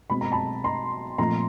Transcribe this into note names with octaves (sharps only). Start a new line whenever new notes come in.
B2 G#3 C4 B5
A#5
A5 B5
A#5 C6
A#2 F3 A3 C4 A#5 C6